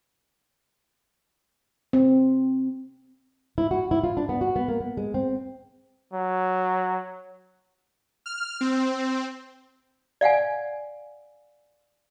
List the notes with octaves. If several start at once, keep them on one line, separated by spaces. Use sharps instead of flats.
C4
E4
F#4
E4
F4
D4
B3
F#4
B3
A#3
B3
G#3
C4
F#3
F6
C4
D5 F5 F#5 G#5